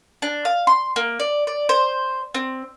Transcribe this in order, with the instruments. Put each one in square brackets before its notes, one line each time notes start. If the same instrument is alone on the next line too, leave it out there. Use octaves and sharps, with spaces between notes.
[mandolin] D4
F5
C6
A#3
D5
D5
C5
C4